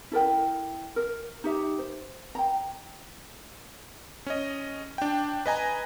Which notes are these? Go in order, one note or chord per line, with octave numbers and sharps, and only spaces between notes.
E4 A4 A#4 G5
A#4
D#4 G4 E5
C5
G5 A#5
C#4 D#5
D4 G5
B4 D#5 G#5 A#5